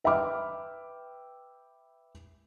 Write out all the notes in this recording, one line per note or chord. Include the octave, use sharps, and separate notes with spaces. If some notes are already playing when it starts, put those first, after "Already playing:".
B4 E5 G5 B5 D6 F6